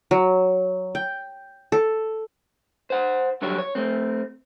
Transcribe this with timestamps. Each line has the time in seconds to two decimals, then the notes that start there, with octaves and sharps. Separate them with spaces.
0.11 F#3
0.95 G5
1.72 A4
2.90 C5 F#5
3.42 G2 D3 F#3 G4 C#5
3.58 C#5
3.75 A3 C4